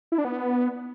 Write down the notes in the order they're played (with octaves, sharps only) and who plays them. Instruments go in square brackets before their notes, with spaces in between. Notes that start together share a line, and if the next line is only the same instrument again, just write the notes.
[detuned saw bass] E4
D4
B3